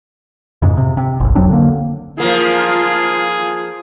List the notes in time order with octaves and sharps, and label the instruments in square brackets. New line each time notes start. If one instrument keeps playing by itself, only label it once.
[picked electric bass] F2 G#2 C#3
C3
C3
G1 C2
F2 F#3 C4 D4
D3 A#3
[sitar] F3 A#3 [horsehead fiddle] F4 [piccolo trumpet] G#4